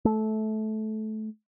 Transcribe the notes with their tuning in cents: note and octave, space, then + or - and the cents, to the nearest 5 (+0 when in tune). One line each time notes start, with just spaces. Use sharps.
A3 -20